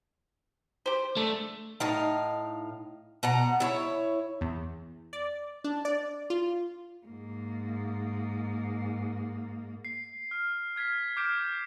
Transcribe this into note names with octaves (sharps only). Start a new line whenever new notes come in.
G4 C5
A3 D4
A2 D#4 F5
B2 F#5 A#5
E4 C#5
E2
D5
D4
D5
F4
G#2 A#3
C7
F6
F6 G#6 B6 C7
D6 F6 G6 C7 D7 E7